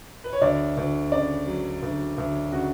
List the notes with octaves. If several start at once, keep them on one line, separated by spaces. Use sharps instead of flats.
B4
C#5
D2 D5
D2
C#3 D5
F#3
D2
D2
C#3 F#4